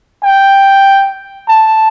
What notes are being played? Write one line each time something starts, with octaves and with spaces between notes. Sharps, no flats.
G5
A5